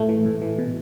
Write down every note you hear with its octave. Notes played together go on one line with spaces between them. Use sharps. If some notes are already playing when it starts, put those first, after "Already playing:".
Already playing: A2 A3
E3
A2
E3
B2